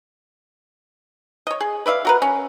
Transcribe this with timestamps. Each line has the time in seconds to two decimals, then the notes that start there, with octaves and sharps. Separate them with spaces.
1.47 C#5 D#5
1.60 G#4
1.86 B4 D5 E5 F5
2.05 F#4 A#4 B4
2.22 C#4